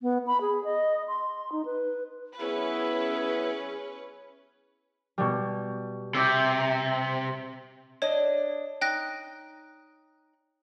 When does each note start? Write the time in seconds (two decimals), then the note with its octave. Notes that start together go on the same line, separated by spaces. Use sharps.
0.02 B3
0.27 B5
0.41 G#4
0.64 D#5
1.08 C6
1.52 D#4
1.65 B4
2.40 F#3 B3 C#4 E4 G#4 B4
5.18 B2 G3
6.15 C3 E5 D6 G6
8.02 D4 C#5 D#5
8.81 D#4 G5 F#6 A#6